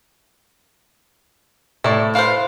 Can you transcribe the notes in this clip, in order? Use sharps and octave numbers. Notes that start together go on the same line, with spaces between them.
A2 E4 D5
E4 B4 C5 F5